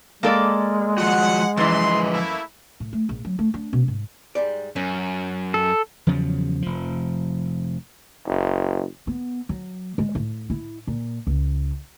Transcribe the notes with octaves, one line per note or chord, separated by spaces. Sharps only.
G#3 A#3 A4 D5
F3 F4 F#4 F#5
F#2 E3 F3 B4 D#5 C6
A3 A#3 E4
A2
A3
A#1
F#3
A3
D4
B2
G#2
G#2 G3 D5
F#2 C#4
A4
E2 C#3 F3 F#3
F1 F3
F#1
B3
F#3
G#3
A2
E4
A#2
C#2